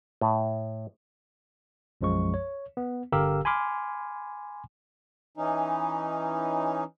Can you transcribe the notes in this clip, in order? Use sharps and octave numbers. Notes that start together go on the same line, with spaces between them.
A2
B1 F#2 F3 G#3 C#6
C#5
B3
G1 D3 G4 A#4 F5 E6
G#5 B5 C6 D6 F6
E3 C#4 D#4